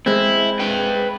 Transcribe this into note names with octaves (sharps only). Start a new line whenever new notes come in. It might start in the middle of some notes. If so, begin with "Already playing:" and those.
G#3 C4 E4
B4 G5